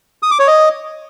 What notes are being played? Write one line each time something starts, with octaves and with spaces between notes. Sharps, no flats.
D#6
D6
C#5
D#5